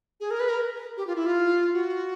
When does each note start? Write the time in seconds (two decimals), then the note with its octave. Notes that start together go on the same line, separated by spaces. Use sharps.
0.20 G#4
0.31 A#4
0.40 B4
0.49 A#4
0.97 G4
1.07 F4
1.16 E4
1.26 F4
1.73 F#4